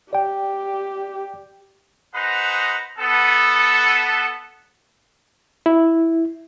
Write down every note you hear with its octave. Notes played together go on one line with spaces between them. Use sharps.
G4 D5 G5
D#4 G#4 B4 C5 F#5 A#5
B3 A4
E4